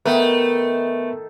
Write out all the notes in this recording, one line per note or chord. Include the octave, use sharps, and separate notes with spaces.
D#3 A3 B3 D#4 A#4 B4